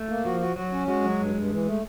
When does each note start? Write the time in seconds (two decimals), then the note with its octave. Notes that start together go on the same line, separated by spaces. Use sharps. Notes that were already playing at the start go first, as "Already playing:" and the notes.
Already playing: A3
0.09 A#3
0.25 F3 F#4
0.40 F#4
0.56 F#3 F#4
0.72 C#4
0.88 G#3 F#4
1.03 F#3
1.19 G2
1.34 G2
1.50 E3
1.66 A3